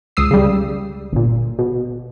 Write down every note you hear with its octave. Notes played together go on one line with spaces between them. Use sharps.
C#2 D#6 E6 C7
C#3 G3
G1 A#2
B2